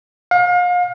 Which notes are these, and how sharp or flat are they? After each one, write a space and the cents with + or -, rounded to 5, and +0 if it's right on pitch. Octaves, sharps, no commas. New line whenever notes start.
F5 +35